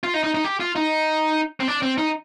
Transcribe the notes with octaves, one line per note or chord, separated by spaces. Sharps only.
F4
D#4
D#4
D#4
G4
F4
D#4
C4
D4
C4
D#4